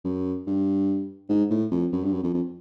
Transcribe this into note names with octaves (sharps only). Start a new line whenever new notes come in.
F#2
G2
G#2
A2
F2
F#2
G2
F#2
F2
F2